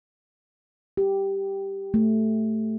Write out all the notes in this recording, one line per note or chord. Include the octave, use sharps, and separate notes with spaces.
G4
A3